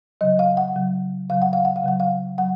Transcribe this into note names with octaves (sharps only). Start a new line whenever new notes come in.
C#3 F#3 D#5
F5
F#5
C#3 F#3
C#3 F#3 F5
F#5
F5
F#5
F5
C#3 F#3 F#5
F5
F#3 F#5